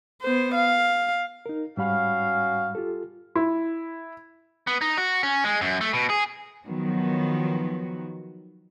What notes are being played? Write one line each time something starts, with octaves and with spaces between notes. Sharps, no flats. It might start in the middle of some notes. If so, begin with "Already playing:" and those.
B3 C5
F5
D#4 A#4
G#2 G3 C#4 F#4 F5 B5
F4 G4 A4
E4
B3
D#4
F#4
C#4
G#3
F#2
A3
B2
G#4
D#3 F3 F#3 B3 F#4